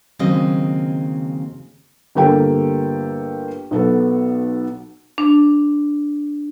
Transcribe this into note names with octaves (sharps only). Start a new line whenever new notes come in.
D#2 C#3 F#3 G#3 C4 D#5
G1 A#3 G4 A4 G5
B1 B3 A4
D4